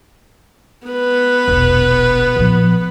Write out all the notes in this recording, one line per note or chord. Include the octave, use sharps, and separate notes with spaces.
B3 B4
E1 A#1
A#2 F3